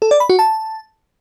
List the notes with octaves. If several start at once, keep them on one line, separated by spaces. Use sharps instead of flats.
A4
D5
B5
F#4
A5